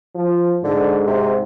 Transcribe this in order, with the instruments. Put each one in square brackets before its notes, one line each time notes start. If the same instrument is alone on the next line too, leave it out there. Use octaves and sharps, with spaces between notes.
[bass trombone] F3
[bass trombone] G#2 [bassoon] D3
[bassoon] C3